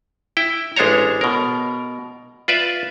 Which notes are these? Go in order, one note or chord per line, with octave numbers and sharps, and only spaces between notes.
E4 G5
A1 G#3 D4 C5 C#5 A#5
B2 A#4
F4 B4 D5 E5